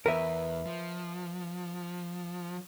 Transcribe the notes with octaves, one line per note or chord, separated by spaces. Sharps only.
E2 A#4 B4 E5
F3